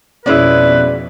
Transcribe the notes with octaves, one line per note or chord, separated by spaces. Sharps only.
F2 B2 G#3 C#4 E4 B4 D5